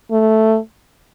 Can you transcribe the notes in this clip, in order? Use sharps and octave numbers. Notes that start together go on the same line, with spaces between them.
A3